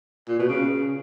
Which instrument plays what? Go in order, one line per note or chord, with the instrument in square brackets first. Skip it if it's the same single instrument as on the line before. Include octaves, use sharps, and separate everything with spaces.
[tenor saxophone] A#2
B2
C#3